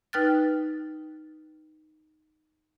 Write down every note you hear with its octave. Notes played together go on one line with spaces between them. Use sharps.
D#4 B4 G5 F6 F#6 A6